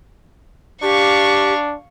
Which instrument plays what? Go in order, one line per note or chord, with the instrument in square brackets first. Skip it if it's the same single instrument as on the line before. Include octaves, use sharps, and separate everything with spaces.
[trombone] D4 [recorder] G4 [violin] F5 C#6